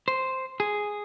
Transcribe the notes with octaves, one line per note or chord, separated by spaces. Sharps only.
C5
G#4